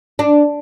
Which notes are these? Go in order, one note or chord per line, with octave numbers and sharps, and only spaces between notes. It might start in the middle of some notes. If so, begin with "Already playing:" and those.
D4